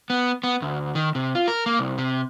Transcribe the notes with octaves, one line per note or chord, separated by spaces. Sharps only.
B3
B3
D2
D#3
C3
F4
A#4
A#3
C2
C3